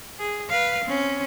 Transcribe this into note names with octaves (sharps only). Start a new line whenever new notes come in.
G#4
B4 F5
C4 C#4